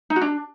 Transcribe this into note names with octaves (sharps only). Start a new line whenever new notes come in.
D#4
F#4
D4